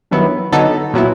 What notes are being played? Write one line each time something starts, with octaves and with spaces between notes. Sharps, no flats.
G2 D#3 F#3 B3 E4
D3 F#3 B3 D#4 A4
A#2 F#3 B3 E4